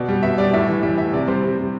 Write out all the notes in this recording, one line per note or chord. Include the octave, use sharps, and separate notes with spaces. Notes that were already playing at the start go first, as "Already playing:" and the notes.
Already playing: B2 D5
G3
B2 E5
G3 D5
A2 E5
E3
G3 E5
A2 E5
C3 D5
G3 C5
C3
G3